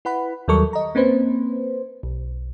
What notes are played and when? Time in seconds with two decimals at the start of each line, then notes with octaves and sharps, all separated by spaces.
0.05 E4 B4 F#5 B5
0.48 D#2 F#3 G3 A4 A#4 C#6
0.73 D#5 A#5
0.95 A#3 C4 C#4 B4 C5
2.03 B1